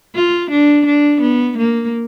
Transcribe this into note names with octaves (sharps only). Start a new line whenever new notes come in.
F4
D4
D4
B3
A#3